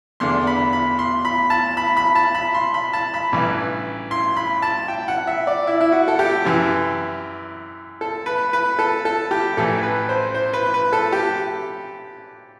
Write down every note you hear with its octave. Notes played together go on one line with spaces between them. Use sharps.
E2 D3 C6
B5
B5
C6
B5
A5
B5
B5
A5
B5
C6
B5
A5
B5
A1 G2 E3
C6
B5
A5
G5
F#5
E5
D5
E4
E4
F#4
A4
G4
F#2 E3
A4
B4
B4
A4
A4
G4
A1 A2 E3 A4
B4
C5
C5
B4
B4
A4
G4